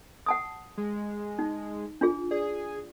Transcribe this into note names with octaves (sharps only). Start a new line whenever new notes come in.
F#5 A5 D#6
G#3
D#4
D4 F4 G#4
G#4 D5